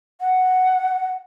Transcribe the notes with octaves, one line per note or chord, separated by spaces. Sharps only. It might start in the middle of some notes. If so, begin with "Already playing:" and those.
F#5